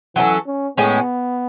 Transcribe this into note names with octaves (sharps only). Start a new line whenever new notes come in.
E3 F#3 C#4 E4 A4
C#4
A2 G#3 B3 C#4